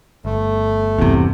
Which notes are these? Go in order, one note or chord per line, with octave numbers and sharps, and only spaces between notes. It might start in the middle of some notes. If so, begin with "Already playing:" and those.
G1 A3
G1 E2 G2 C3